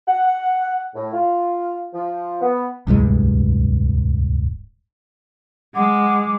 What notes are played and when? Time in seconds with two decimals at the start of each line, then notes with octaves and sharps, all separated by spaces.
0.08 F#5
0.95 A2
1.13 F4
1.93 F3
2.41 B3
2.87 D1 C2 G2 G#3
5.75 G#3 F#5 D6